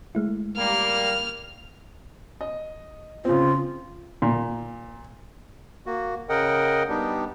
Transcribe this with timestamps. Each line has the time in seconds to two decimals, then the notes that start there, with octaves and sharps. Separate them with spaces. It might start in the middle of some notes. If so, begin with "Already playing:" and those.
0.15 G#3 A3 E4
0.57 G3 A#3 F6
2.41 D#5
3.25 C#3 C4 F4
4.22 A#2
5.86 A#3 F#4
6.29 C#3 A#4 D#5 F#5 G5
6.89 G3 B3 D4 D#4 G4